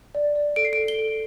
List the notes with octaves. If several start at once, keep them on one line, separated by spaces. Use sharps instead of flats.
D5
D5
A4 D7
C7
A4 D7
G7
A4